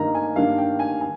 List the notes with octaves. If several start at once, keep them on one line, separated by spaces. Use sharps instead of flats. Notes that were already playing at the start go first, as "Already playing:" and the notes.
Already playing: G2 D#3 A#3 D#4 A#5
G#5
G2 D#3 G3 A#3 D4 F5
G5
G#5
G#5